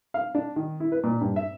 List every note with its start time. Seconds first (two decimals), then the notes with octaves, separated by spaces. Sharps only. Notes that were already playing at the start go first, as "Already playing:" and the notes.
0.14 F5
0.35 D4
0.56 D#3
0.80 E4
0.92 B4
1.04 A#2
1.21 G2
1.36 E5